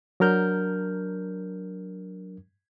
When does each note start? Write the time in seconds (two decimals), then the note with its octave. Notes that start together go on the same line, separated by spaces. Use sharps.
0.20 F#3 D4 A#4 F6 G6